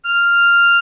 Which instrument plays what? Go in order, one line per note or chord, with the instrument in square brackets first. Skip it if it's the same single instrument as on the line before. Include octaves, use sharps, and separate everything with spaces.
[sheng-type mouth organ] F6